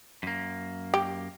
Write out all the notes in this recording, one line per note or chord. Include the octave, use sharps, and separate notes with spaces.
F#2 A#3
G4